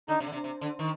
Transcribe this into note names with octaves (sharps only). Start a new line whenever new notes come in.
D3 D#4
C3
D3
C3
C3
D3
D#3